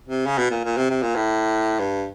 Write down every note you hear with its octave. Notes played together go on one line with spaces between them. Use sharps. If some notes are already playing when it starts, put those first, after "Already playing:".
C3
C#3
B2
A#2
A#2
C3
C3
A#2
A2
G2